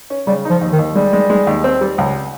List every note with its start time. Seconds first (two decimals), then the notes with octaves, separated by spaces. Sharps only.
0.10 C#4
0.27 C#3 G3
0.45 D#4
0.50 F3
0.61 D#2
0.73 D#3
0.79 D#2
0.95 G3 G#3
1.13 G#3
1.30 G#3
1.47 D#2
1.64 C4
1.81 G3
1.98 C#2